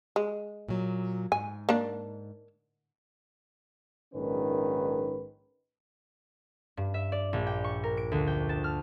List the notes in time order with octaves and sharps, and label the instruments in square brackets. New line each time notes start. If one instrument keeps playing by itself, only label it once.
[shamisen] G#3
[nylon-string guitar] A#2 F#3
[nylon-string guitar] G#2 [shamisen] G#5
[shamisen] A#3 D4
[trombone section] A#1 G#2 D#3 C#4 B4
[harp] G2
E5
D5
A#1
G5
C#6
A#4
D7
D2
G5
A5
F6